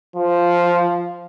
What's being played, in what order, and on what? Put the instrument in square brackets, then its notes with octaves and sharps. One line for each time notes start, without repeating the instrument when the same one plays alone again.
[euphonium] F3